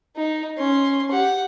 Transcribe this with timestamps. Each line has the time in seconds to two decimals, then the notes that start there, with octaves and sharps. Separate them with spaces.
0.16 D#4
0.58 C#4 C6
1.11 G4 F#5